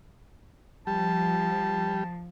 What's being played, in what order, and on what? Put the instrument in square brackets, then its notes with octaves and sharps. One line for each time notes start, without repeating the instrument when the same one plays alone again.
[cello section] F3 [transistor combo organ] G3 [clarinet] A5